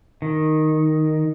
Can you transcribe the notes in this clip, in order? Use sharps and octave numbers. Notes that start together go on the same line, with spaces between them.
D#3